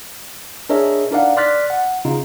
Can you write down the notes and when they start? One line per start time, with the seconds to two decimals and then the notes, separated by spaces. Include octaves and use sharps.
0.69 D4 G#4 A#4 C#5 D#5 E5
1.11 D4 D#4 A#4 D5 F5 F#5
1.37 D5 C6 F6 F#6 A6 B6
1.70 F#5
2.05 C#3 D#4 F4